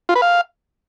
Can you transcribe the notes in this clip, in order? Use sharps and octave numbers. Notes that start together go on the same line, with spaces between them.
F4
B4
F5